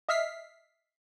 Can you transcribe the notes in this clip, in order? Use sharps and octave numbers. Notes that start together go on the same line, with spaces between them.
D#5 E5 F6 B6 C7